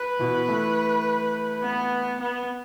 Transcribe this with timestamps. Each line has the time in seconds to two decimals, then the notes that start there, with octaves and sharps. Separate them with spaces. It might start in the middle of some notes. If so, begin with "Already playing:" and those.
Already playing: B4
0.19 B2 E3
0.48 E3 A3
1.62 B3
2.20 B3